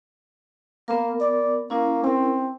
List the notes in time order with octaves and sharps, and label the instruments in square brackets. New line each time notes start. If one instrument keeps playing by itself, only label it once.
[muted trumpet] A#3 [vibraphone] B3 A#4
[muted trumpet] D5
[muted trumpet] A#3 [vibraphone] C#4 E4 A#4
[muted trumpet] C4